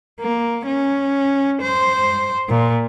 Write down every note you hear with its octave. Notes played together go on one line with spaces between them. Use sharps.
A#3
C#4
C5
A#2